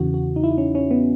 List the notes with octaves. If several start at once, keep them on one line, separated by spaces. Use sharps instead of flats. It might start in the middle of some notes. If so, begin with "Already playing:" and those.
Already playing: E2 C#3 E3 F#4
F#4
D#4
E4
D#4
C#4
C#4
B3